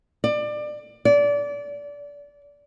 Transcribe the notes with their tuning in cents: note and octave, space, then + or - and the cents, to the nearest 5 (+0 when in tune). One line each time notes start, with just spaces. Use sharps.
D5 +25
D5 -25